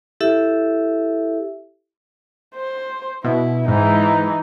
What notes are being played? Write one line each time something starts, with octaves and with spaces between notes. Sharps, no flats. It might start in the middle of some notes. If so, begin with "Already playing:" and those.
E4 G4 A4 E5
C5
B2 E4
G#2 E3 D#4